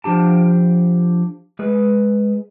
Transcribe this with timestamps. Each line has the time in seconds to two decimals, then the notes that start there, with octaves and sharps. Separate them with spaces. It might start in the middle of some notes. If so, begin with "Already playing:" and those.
0.04 F3 D4 G4 A5
1.59 G#3 G#4 B4